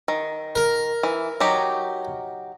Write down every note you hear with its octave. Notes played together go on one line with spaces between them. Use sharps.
D#3
A#4
E3
F#3 D#4 G4